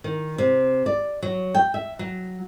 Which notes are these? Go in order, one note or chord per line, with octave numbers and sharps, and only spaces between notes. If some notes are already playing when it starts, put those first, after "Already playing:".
D#3
C3
D5
F#3
G5
E5
F#3